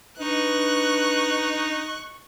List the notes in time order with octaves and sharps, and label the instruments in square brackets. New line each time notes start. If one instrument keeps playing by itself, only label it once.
[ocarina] D4 [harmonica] D#4 [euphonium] B4 [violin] C#6 F#6